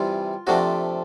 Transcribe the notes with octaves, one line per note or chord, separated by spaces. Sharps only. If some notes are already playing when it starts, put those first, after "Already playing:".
Already playing: C3 E3 G3 F4
C3 F3 A3 D4 F#4